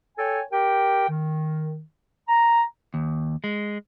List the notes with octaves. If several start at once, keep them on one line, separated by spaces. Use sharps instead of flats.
A4 C#5 G5 G#5
G4 A#4 G5
D#3
A#5
D#2
G#3